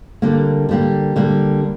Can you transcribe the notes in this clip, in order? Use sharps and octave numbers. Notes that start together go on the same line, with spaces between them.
D3 G3 A#3
D3 G3 A#3
D3 G3 A#3